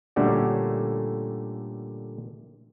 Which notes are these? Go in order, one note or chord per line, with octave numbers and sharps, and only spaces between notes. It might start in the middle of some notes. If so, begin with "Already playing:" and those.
A#2 D3 G3 A3 C#4 F#4